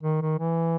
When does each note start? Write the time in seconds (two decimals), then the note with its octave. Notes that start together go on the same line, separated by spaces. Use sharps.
0.03 D#3
0.21 D#3
0.39 E3